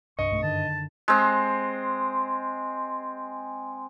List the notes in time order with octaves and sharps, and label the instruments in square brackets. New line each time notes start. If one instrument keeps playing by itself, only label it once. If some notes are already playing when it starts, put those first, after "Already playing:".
[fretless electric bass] C2 [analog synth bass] G2 [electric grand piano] D#5 [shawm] C#6
[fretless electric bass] B1 G#2 A3
[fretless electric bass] F#2 D3 D#3 [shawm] A5
[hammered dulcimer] G#3 C4